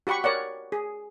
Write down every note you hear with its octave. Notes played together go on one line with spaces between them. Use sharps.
F#4 G4 F#5 B5 C#6
A#4 C#5 D5 F#5
G#4